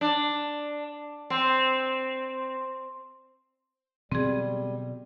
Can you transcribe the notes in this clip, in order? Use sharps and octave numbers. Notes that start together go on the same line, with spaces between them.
D4
C4
B2 D3 F#3 G3 C4 G#4